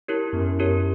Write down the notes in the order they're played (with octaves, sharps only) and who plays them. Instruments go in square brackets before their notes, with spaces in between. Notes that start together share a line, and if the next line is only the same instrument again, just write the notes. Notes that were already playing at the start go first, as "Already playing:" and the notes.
[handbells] E4 G4 A#4 C#5
[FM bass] F#2 [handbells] B3
[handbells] E4 G4 A#4 C#5